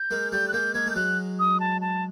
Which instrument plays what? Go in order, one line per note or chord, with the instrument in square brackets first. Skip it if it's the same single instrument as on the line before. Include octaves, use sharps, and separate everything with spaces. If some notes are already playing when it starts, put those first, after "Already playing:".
Already playing: [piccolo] G6
[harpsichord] G#3 A#3
[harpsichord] G3 A3 [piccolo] G6
[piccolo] F#6
[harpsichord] G#3 A#3 [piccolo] G6
[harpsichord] G#3 A#3 [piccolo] G#6
[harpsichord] A3 [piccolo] G6
[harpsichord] F#3 G#3 [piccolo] F#6
[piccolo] D#6
A5
A5